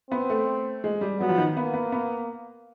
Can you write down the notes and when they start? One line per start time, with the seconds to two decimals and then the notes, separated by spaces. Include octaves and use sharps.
0.11 B3 C4
0.30 A3
0.84 G#3
1.01 G3
1.20 F#3 B3
1.29 F3
1.38 D#3
1.56 A#3 B3
1.74 B3
1.92 B3